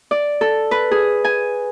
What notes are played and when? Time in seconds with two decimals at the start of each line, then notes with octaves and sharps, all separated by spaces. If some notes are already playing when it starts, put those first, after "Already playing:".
0.11 D5
0.41 A4
0.71 B4
0.91 G#4
1.24 G#5